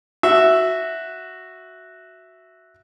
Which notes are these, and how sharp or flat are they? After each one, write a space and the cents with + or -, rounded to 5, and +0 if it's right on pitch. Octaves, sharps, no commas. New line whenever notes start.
F#4 +0 E5 +0